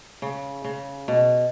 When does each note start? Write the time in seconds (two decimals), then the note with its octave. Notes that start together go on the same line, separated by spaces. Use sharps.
0.22 C#3
0.65 C#3
1.08 B2